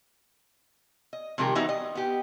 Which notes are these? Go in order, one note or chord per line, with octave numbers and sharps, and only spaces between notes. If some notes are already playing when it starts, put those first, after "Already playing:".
D#5
C3 D#3 F3 G#3 G4 A#4
E3 G3 B3 D#4 F#4 E5
D#5
B3 G4